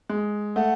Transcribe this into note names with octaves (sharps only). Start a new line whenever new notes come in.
G#3
A3 F#5